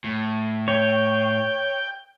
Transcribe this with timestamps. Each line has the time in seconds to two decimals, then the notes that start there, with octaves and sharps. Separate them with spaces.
0.04 A2
0.68 C#5 G5